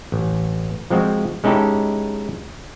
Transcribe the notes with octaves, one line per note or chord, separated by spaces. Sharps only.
A1
F3 G#3 C4 F#4
G#3 C#4 D#4 E4 G4 A4